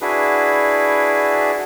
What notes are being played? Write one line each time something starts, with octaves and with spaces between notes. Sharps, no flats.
D4 E4 F#4 G#4 B4